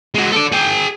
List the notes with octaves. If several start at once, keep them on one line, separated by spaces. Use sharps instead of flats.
G#3 F#4
A4 D5
G#4 G5